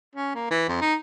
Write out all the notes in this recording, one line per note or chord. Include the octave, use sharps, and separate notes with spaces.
C#4
A#3
E3
F2
D#4